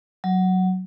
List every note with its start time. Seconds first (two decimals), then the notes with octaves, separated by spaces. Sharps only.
0.24 F#3